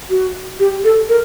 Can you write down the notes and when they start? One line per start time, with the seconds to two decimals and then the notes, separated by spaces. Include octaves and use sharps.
0.10 F#4
0.59 G4
0.84 A4
1.09 A#4